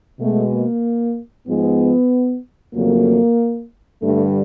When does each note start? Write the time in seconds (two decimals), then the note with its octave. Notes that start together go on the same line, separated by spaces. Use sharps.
0.19 B2 G#3 A3
0.51 A#3
1.47 G#2 F3 G#3 B3
2.74 F2 C#3 F#3 A3 A#3
4.02 G2 D3 G3 A3